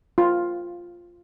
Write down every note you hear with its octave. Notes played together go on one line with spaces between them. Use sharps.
F4